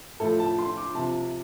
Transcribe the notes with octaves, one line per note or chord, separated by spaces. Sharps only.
A2 F3 A4
A5
C6
D6
C3 F3 A5